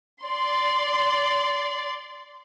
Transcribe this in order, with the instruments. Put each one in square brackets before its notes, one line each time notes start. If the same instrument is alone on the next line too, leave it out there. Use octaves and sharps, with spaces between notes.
[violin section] D5 C6